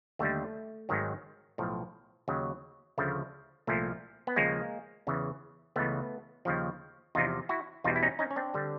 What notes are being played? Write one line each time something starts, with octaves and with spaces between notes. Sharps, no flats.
D#2 D3 G3 A3
G#1 G#2 D#3 F#3
B1 A2 F3
D#2 C#3 F#3
D2 C#3 F3 A3
C2 A#2 F3 A3
B3
D#2 C#3 F3 G#3 A#3
E2 C#3 E3
C#2 C#3 E3 A3 B3
D#2 C#3 F3
E2 C3 F3 D#4 F4
E4 F#4
E2 B2 G3 D#4 F4
E4
C#4 D#4
C#4 D#4
C#4
C4 D4
D3 G3